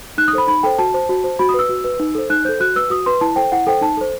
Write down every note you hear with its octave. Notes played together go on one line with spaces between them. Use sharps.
D#4 F#6
D#6
A4 C5 B5
D#4 B5
A4 C5 G5
F#4 A5
C5
F#4
C5
F#4 B5
D#6
B4 E6
F#4
B4
D#4
A4 C5
D#4 F#6
A4 C5 G6
F#4 F#6
B4 E6
F#4 D#6
B4 C6
E4 A5
A4 C5 G5
E4 F#5
A4 C5 G5
D#4 A5
A4 C5